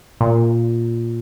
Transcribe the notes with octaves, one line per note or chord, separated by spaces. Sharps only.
A#2